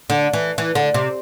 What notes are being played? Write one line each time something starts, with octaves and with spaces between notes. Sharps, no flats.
D3
E3
E3
D3
C3